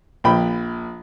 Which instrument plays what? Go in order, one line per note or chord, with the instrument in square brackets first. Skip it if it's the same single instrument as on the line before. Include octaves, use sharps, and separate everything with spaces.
[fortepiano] A#1 G5 B5